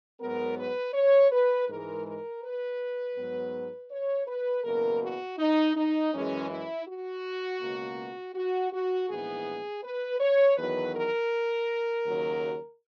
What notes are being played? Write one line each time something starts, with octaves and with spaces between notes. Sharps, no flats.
G#2 F#3 B3 A#4
B4
C#5
B4
G#2 E3 G#3 A#4
A#4
B4
G#2 F#3 B3
C#5
B4
F#1 E2 B2 A#3 A#4
F#4
D#4
D#4
F#2 E3 G#3 C#4
E4
F#4
C#2 B2 A#3
F#4
F#4
A#1 G#2 E3 B3 G#4
B4
C#5
E2 D#3 F#3 B4
A#4
D#2 C#3 F#3